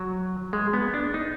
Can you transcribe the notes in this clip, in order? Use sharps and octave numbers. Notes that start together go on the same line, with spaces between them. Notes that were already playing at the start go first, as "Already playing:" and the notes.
Already playing: F#3
G#3
B3
D4
D#4